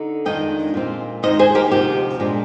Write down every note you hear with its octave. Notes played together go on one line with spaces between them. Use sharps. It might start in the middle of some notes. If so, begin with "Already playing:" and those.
Already playing: D3 D#4
F2 D#3 G#3 D4 F4 D#5 G5
A#2 G#3 C4 F4
D#2 D#3 G#3 D#4 C5 D#5
G#4 C5
G4 A#4
D2 C3 F3 C4 G4
A#2 G#3 D4